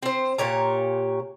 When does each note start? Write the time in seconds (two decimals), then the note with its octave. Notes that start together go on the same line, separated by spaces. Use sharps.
0.03 C4 C5
0.38 A#2 G4 C#5 A#5